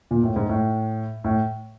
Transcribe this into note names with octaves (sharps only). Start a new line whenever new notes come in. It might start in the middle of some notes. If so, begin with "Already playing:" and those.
A#2
A2
G#2
A2
A2